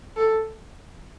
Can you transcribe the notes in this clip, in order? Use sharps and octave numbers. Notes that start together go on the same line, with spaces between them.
A4